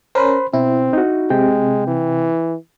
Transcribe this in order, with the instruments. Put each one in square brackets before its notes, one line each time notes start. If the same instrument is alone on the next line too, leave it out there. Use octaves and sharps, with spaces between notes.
[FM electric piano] C#4 A#4 [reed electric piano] C5 B5 C6
[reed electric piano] B2 [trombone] C4 [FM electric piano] E4
[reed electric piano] D#4 F#4
[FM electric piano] C3 [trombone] G#3 [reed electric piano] G5
[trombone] E3